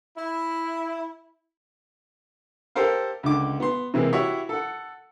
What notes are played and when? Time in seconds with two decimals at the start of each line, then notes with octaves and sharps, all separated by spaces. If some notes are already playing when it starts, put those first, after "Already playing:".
0.16 E4
2.75 G4 A4 A#4 C5 F5
3.23 C#2 D3 D6
3.60 B3 C6
3.94 C3 E3 G#3 A#3
4.13 E4 F#4 G4 C#5 E5
4.49 A4 F#5